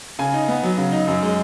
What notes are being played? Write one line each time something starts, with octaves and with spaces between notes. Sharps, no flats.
C#3 G#5
D#4
B3
F#3
C#3
D#4
F#2
G#3